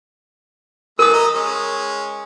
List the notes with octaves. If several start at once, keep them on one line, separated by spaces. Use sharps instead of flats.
E3 A3 A#4 D#6 E6
D#5 A#5
G#3 C#4